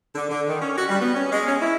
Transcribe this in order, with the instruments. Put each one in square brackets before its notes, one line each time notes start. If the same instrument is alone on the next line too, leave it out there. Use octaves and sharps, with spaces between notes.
[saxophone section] D3
D3
D#3
C#4
F#4
G3
B3
C#4
G#3
C#4
E4